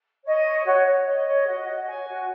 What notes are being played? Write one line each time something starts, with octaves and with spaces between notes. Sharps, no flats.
C#5 D#5
C#5
F#4 C#5
C#5
C#5 D#5
C#5
F#4
F#4
C#5 G#5
F#4